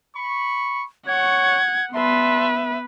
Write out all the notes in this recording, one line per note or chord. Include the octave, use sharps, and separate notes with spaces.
B5 C#6
C#5 F#5 C#6 G#6
G3 B3 B4 E5 A5 C6